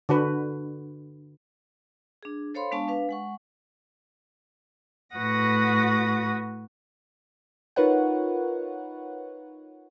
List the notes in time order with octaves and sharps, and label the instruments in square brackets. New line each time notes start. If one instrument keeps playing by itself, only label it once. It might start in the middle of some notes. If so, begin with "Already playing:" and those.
[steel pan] D3 F#4 B4
[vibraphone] D4 G#4
A4 C5 C#5 F5 B5 C6
G#3 B3 D4 F5 A5 C#6
D4 B4 F5
G#3 F#5 C#6
[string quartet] A2 F#4 B4 F#5 D#6 A#6
[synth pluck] D#4 F4 A#4 B4 C#5 F#5